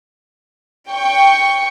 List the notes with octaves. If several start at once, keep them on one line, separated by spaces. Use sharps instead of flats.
G5 C#6